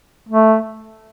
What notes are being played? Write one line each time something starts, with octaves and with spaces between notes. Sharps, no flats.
A3